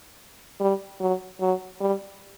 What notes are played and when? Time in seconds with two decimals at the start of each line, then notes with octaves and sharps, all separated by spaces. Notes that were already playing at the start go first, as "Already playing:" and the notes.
0.60 G3
1.00 F#3
1.40 F#3
1.80 G3